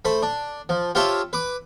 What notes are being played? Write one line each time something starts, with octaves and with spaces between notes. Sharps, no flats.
A3 C5 B5
D4
F3
F4 G4 C5 C#5 E5 A5
B4 D6